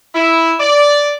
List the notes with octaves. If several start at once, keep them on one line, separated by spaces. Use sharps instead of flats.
E4
D5